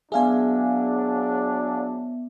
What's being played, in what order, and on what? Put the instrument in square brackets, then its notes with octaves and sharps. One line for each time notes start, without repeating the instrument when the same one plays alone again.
[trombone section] F#3 D4 [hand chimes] B3 E5 [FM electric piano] G#4 F5 G#5